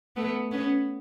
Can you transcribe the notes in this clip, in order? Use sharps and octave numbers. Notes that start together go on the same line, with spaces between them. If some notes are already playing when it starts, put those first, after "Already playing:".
A3 B3
B3 C#4